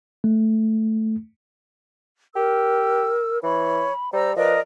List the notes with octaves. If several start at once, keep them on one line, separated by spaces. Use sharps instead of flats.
A3
G4 A#4 E6
E3 C#5 B5
G3 C5 A#5 E6
F3 A#4 B4 D5 D#5